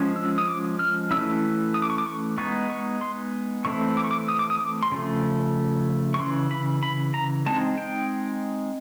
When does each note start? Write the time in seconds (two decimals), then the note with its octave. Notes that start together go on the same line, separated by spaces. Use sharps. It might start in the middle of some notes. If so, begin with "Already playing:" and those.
Already playing: F3 G#3 C#4
0.16 E6
0.38 D#6
0.48 D6
0.79 F6
1.11 E3 A3 C#4 E4 E6
1.74 D#6
1.82 D6
1.90 C#6
1.98 D6
2.06 C#6
2.38 G#3 B3 D#4 C#6
2.70 C#6
3.01 C6
3.65 E3 A3 C4 E4 C#6
3.97 D6
4.04 C#6
4.11 D6
4.28 D#6
4.39 D6
4.50 D#6
4.61 D6
4.83 C6
4.92 C#3 F3 A3
6.14 C#6
6.19 C#3 E3 C6
6.51 B5
6.83 B5
7.14 A#5
7.46 G#3 C4 D#4 A5
7.78 G5